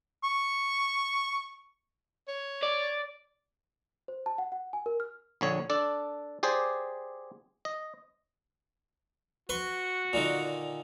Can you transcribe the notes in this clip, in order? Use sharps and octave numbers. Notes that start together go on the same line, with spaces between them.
C#6
C#5
D5
C5
A5
F#5
F#5
G#5
A#4
F6
A#1 D3 C#5
D4 A4 D5
G4 G#4 C5 D5
D#5
F#4 B4 C6 C#6
A#2 D3 D#3